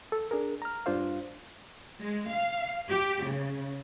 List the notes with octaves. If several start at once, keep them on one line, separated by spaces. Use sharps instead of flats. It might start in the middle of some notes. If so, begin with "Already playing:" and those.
A4
D4 G#4 A#4
A#5 F6
G2 D4 F4 C5 F5
G#3
F5
G4
C#3